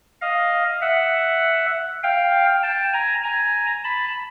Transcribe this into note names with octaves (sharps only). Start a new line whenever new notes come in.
D#5 F5
E5 F#5
F5 G5
G5 A5
G#5 A#5
G#5 A#5
A5 B5